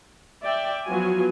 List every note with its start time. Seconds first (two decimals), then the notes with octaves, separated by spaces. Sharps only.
0.42 D5 E5 G5
0.86 F3 F#3 B3 F4 F#4 G#5